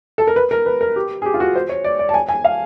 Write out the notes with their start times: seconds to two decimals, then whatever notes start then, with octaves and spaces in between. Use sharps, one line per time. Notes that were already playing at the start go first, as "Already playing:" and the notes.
0.18 A4
0.27 A#4
0.36 B4
0.51 A#4
0.66 B4
0.81 A#4
0.96 G4
1.22 G#4
1.26 G4
1.34 F4
1.40 F#4
1.56 C5
1.69 C#5
1.84 D5
1.99 D5
2.09 A5
2.14 G#5
2.29 G#5
2.45 F5